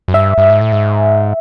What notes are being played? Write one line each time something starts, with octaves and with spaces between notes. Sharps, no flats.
F#2
G2 E5
G2
G#2
A2
G#2